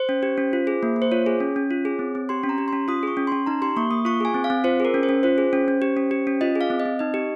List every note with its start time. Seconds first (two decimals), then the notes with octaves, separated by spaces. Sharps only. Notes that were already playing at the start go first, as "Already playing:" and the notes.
Already playing: C5
0.09 C#4
0.23 G4
0.38 C#4
0.53 F4
0.67 G#4
0.83 A#3
0.96 A#3
1.02 C5
1.12 F4 C#5
1.26 G#4
1.40 C#4
1.56 C#4
1.71 F4
1.85 G#4
1.99 C4
2.15 C4
2.29 G4 C6
2.43 C#4
2.49 A#5
2.58 G4
2.68 C#4 C6
2.88 F4 D#6
3.03 G#4 C#6
3.17 C#4
3.27 C#4 C6
3.46 D#4 A#5
3.62 G4 C6
3.76 A#3 C#6
3.91 A#3 D#6
4.05 F4 C#6
4.20 G#4 G#5
4.34 C4
4.44 F5
4.50 C4
4.64 F4 C5
4.80 G#4 A#4
4.94 C#4
5.03 C5
5.09 C#4
5.23 F4 C5
5.38 G#4
5.53 C#4
5.68 C#4
5.82 G4
5.97 C#4
6.11 G4
6.27 C#4
6.41 F4 D#5
6.56 G#4
6.61 F5
6.70 C4
6.80 D#5
6.85 C4
6.99 D#4 D#5
7.14 G4